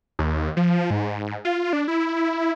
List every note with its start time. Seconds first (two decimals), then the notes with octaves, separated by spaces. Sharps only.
0.19 D#2
0.57 F3
0.90 G#2
1.45 F4
1.73 D4
1.88 E4